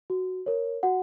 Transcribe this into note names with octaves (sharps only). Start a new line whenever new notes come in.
F#4
A#4 C#5
F#4 F#5